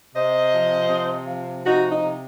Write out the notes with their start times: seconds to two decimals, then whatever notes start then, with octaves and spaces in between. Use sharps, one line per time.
0.13 C3 C5 D#5
0.52 F3
0.89 C3
1.27 F3
1.64 C3 D#4 F#4
1.90 D#4
2.03 C3